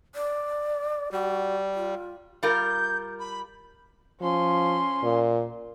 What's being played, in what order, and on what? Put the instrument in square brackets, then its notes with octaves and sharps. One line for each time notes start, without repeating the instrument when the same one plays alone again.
[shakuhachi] D5
[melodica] G3 [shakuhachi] F#4
[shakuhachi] F4
[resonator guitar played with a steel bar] G3 F4 A#4 [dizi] G6
[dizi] B5
[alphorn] F3 [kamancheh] C#4 C6
[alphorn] A#2